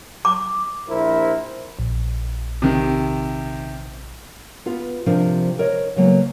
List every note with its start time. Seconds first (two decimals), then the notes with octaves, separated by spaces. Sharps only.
0.25 D6
0.89 A#1 E4 A#4 C5
1.79 A#1
2.62 C3 D#3
4.66 B3 F4 B4
5.06 C3 F3 D4 A#4
5.59 A#4 C#5 D#5
5.96 C#3 F#3 A#3 B3